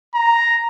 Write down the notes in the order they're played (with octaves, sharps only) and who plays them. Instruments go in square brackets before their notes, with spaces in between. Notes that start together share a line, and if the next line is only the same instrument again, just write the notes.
[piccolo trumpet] A#5